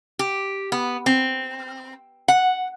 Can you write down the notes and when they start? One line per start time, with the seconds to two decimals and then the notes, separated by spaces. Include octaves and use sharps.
0.19 G4
0.72 B3
1.06 C4
2.28 F#5